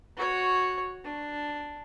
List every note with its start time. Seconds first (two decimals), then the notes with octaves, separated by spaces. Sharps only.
0.17 F#4 C#5
1.05 D4